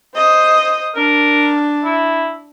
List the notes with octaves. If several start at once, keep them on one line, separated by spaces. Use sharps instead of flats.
C5 D#5
D4 A#4
E4